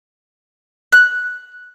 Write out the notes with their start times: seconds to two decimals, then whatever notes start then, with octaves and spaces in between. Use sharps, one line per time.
0.92 F#6